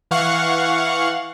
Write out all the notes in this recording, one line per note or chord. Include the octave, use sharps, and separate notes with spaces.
E3 F5 F#5 C#6